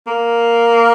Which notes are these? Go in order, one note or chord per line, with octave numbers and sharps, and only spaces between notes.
A#3